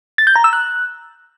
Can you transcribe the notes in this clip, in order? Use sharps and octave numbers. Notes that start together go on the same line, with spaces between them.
A6
G6
A#5
E6
F#6